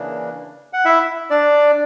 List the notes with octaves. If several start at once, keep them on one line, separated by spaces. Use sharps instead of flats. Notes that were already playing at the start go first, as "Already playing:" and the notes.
Already playing: C#3 E3 A#3 D4
F#5
E4 E5
D4 D5